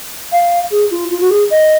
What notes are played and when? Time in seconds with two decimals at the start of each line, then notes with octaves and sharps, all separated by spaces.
0.33 F5
0.71 G#4
0.91 F4
1.11 F4
1.20 F#4
1.30 G#4
1.51 D#5